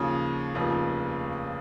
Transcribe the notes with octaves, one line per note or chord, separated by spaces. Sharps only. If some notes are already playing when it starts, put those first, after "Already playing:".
Already playing: D#2 C#3 F3
F1 D#2 C#3 F3